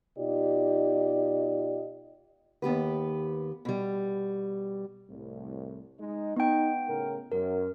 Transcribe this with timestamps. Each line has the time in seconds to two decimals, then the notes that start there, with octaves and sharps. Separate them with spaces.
0.17 B2 D#4 F4 G4 D5 D#5
2.62 D#2 B3 G4 B4
3.65 B2 G3
5.09 C2 A2
6.00 G#3 D#4
6.36 B3 D#4 G5
6.88 A2 C#3 A#4
7.32 F#2 A#4